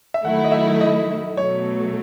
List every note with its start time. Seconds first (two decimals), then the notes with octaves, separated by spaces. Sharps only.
0.14 E5
0.24 D#3 F#3 A3 E4 F#5
0.44 D#5
0.52 E5
0.81 D#5
1.37 B2 F#3 A3 C#5